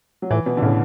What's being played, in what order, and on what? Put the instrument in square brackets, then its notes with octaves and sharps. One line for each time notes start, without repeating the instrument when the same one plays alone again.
[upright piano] F#3
[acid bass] A2 [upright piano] E3
[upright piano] B2
D3
[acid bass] A2 [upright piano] C#3